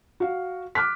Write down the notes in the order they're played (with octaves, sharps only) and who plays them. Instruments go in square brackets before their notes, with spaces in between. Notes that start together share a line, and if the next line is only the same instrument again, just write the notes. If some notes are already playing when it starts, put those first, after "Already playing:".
[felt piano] F#4 F5
D6 F6 F#6 B6